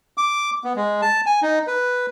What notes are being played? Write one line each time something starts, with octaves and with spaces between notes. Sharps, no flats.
D6
B3
G#3
A5
G#5
D#4
B4